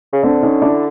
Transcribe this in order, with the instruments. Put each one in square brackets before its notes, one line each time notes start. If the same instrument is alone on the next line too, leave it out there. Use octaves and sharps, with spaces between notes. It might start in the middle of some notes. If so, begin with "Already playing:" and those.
[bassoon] C#3
[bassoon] D3 [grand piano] C4 D4
[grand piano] C#4 D#4
D4 E4